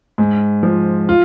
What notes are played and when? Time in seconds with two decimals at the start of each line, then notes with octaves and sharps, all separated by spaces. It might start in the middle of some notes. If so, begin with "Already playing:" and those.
0.18 G#2
0.63 F3
1.09 F4